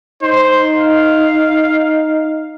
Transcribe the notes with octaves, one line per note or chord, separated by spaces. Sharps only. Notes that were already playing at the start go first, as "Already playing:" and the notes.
D#4 C5
F5